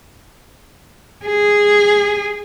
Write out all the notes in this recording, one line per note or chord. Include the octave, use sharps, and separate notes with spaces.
G#4